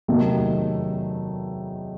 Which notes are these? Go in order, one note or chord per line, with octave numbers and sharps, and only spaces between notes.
E2 C3 D#3 F#3 A3